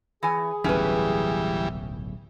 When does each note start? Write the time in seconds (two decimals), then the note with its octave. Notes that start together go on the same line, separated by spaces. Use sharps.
0.23 E3 G#4 G#5
0.64 D1 B1 C#3 E3 G3 C#4 B4